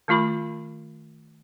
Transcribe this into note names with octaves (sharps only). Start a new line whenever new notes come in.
D#3 A3 F4 B5 D6